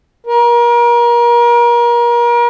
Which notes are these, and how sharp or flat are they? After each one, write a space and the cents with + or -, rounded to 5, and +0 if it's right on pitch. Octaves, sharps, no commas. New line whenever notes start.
A#4 +35